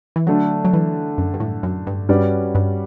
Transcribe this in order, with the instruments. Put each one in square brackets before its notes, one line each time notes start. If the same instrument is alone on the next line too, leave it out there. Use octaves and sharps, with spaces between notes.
[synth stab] E3
[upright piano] D3 A3 D4 A4 [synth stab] F#3
[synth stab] F#3
E3
F#2
G2
A2
F#2
G2
[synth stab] G2 [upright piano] G3 C#4 F#4 B4 D5
[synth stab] G2